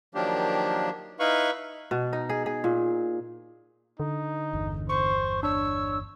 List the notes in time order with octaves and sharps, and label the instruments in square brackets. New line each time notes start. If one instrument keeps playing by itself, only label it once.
[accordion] D#3 F3 F#3 A#3 D4 G4
D#4 E4 B4 F5 B5 C#6
[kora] B2
D#4
G#4
G#4
A#2
[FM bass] D3 [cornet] D#4
[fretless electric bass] G1 E2
[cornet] C5 [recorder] C#6
[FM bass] D4 [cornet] C#5 [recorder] E6